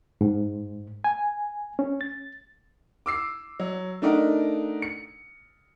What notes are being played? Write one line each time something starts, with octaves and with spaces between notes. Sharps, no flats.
G#2
G#5
C#4
A6
D6 E6 C7
F#3
A3 D4 D#4 A#4 D#5 F#5
C#7